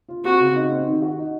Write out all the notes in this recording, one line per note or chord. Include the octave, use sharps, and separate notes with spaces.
F4
C4 F#4
C#3
D#4
C4
D#3
F#4
D#4